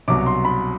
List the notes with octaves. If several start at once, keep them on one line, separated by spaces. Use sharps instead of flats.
C2 B2 F#3 D6
C6
B5